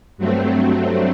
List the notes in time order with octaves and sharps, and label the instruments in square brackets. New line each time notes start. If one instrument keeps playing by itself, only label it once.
[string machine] G2 F#3 A3 C4